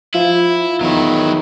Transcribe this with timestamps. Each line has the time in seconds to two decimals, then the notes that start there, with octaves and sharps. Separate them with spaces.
0.14 F3 E4 F4
0.81 E2 D#3 F#3 E4